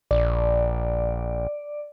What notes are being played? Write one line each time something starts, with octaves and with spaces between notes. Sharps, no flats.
A#1 D5